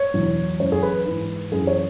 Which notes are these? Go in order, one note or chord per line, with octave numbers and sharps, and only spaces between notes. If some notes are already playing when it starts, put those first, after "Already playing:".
Already playing: C#5
E2 B2 F#3
F#2 E3 C#5
G#4
B4
G#2 E3 B4
F#2 E3 G#4
C#5